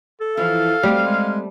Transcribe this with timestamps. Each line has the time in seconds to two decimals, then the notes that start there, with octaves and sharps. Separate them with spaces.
0.21 A4
0.37 E3 F3 F5
0.83 G3 A3 C4
1.05 G#3